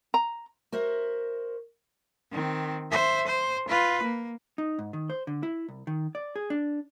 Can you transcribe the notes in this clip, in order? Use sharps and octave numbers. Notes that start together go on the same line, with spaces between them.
A#5
F#4 A#4 C5 E5
D#3 C4
C5 E5
C5
F4 B4
A#3
D#4
G#2
D#3
C5
D3
E4
C2
D#3
D5
G#4
D4